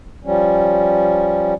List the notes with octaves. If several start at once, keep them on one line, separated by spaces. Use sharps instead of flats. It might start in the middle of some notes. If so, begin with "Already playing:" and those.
F3 G3 C#4